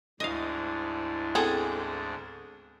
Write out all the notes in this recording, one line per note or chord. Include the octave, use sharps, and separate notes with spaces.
D2 G#2 D4 E4 D#5 F5
B3 C4 G#4 A4